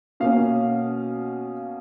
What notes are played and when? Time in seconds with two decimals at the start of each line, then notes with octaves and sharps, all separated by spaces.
0.20 B2 A#3 C#4 F5